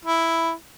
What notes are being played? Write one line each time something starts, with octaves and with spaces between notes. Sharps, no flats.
E4